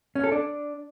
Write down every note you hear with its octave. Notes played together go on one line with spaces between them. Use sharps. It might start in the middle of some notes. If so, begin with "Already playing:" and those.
C#4
A4
D4